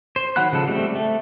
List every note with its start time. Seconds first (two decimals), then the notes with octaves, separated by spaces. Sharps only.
0.16 C5
0.36 D#3 F#3 F#5 B5 F#6
0.52 C#3 F3 G#3 A4
0.67 G3 A3 C4
0.95 A3